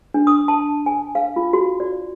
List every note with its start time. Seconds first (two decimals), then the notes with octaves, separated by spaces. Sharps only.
0.14 D4
0.27 D#6
0.48 A5
0.86 G#5
1.15 F5
1.36 F4
1.53 F#4
1.80 D5